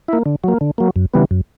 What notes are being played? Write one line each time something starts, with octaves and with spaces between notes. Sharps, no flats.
A#3 E4
D3
F#3 A#3
D3
F#3 A#3
F#2
C#3 E3 G3 B3
F#2